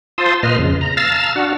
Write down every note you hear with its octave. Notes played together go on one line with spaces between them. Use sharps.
F4 C5 A5 C6 D#6 E6
A#2 B4 D#5 F6
F2 C#3
A#5
F5 A5 A#5 E6 F6 A6
D4 F#4 F#5